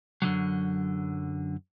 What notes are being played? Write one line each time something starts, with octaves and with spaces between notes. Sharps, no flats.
F#2 D3 E3 F#3